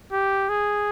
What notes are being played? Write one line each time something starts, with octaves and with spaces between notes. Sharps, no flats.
G4
G#4